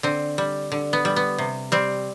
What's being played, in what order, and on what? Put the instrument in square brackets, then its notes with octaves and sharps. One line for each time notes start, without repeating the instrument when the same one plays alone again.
[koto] D3 C4
G3
D3
B3
G3
B3
C3
G3 C4